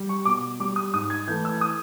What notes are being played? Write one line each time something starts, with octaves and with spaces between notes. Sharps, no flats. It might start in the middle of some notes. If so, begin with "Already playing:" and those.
Already playing: G3
C#6
B2 D6
G3 D6
D#6
G#2 D#6
G#6
E3 A3 G6
E6
D#6